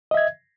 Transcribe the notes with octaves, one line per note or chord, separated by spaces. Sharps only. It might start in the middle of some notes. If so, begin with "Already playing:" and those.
D#5 E5 G#6